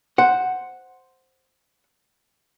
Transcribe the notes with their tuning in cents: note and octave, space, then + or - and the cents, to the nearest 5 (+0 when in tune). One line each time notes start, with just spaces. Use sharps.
C5 +0 F#5 +0